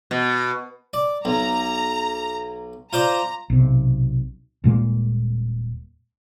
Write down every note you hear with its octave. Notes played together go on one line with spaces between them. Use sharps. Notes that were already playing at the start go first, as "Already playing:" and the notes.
B2
D5
B1 A#5
F4 C5 D5 A#5
B1 C3
D#1 A#2 G#3 A#3